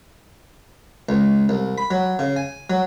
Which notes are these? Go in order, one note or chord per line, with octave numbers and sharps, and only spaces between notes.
C#2
C2
B5
F#3
C#3
G#5
F#3